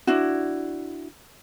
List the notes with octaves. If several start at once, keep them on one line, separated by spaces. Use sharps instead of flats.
D4 E4 F#4